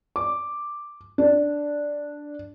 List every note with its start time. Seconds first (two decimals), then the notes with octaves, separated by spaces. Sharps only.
0.16 D6
1.18 D4